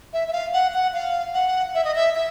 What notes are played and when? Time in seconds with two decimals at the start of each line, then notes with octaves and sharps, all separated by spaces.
0.13 E5
0.28 E5
0.33 F5
0.53 F#5
0.74 F#5
0.94 F5
1.34 F#5
1.75 E5
1.84 D#5
1.95 E5
2.15 E5